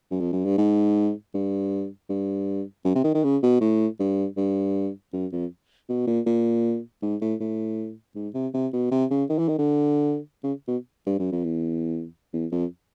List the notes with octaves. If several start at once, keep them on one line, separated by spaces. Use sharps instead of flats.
F#2
F2
F#2
G2
G#2
G2
G2
F#2
C3
D#3
D#3
C#3
B2
A2
G2
G2
F#2
F2
B2
A#2
A#2
G#2
A2
A2
G#2
C3
C3
B2
C3
C#3
D#3
E3
D#3
D3
C#3
B2
G2
F#2
F2
E2
E2
F2